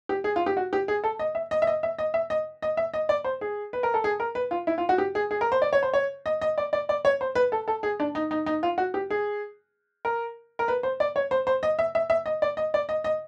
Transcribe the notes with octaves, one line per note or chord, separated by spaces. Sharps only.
G4
G#4
F4
G4
F#4
G4
G#4
A4
D#5
E5
D#5
E5
D#5
E5
D#5
E5
D#5
D#5
E5
D#5
D5
C5
G#4
B4
A#4
A4
G#4
A#4
B4
F4
E4
F4
F#4
G4
G#4
G#4
A#4
C5
D5
C#5
C5
C#5
D#5
D#5
D5
D5
D5
C#5
C5
B4
A4
A4
G#4
D4
D#4
D#4
D#4
F4
F#4
G4
G#4
A#4
A#4
B4
C5
D5
C#5
C5
C5
D#5
E5
E5
E5
D#5
D5
D#5
D5
D#5
D#5